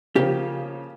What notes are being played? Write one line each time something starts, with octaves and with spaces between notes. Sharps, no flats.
C#3 F3 A#3 G4